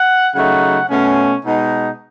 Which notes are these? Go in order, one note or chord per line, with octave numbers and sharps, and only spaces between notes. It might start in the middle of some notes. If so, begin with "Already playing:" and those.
Already playing: F#5
C#3 F#3 A3 D#4 F#5
B2 A3 C#4
B2 G#3 D#4